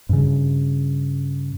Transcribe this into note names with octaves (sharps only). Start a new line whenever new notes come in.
G2 C#3